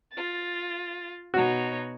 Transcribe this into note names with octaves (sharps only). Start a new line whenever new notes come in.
F4 A6
B2 D#4 F#4 C#5